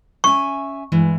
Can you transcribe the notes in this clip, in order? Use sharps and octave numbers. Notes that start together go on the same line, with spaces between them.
C#4 E5 G#5 C#6
G2 E3 G#3